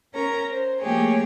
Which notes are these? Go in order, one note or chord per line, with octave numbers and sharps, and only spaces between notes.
C#4 A#4 C#5 A#5
C5
F3 A3 A#3 G4 G#4 C#5